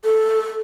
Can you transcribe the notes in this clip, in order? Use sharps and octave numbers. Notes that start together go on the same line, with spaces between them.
A4